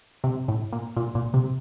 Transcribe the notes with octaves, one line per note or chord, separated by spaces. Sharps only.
C3
A2
A#2
A#2
A#2
C3